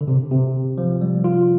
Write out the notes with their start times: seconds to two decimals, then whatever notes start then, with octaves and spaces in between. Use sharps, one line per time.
0.01 D3
0.08 C3
0.31 C3
0.78 F3
1.01 G3
1.24 F4